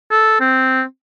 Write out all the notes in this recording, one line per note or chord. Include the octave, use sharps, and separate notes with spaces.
A4
C4